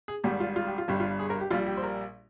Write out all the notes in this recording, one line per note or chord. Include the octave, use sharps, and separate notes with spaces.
G#4
G#1 G#2 G3 G4
F4
F4
G4
F4
G1 G2 G3 G4
F4
G#4
A#4
G4
A#1 A#2 G3 F4
G4
C5
A#4